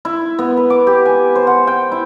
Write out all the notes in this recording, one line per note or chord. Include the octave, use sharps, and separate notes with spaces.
E4
B3
B4
D6
G4
G#5
C5
F#5
G5
E4